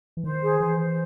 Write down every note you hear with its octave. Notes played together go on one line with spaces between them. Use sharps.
E3
D#3 C5
G#4
E3 C5
C5